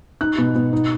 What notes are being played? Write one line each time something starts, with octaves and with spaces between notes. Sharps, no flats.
D#4 F#6
B2
B2
D#4